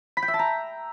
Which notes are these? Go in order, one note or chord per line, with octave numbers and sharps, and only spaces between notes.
B5
G5
E5
A5
A#5